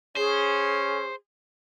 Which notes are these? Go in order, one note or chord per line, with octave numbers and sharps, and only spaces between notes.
C#4 G#4 C5